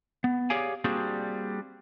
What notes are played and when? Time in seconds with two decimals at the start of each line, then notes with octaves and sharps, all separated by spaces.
0.24 B3
0.50 G4 G#4 C#5 D5 F5 G#5
0.84 G3 A#3 C4 D4 F#4 G#4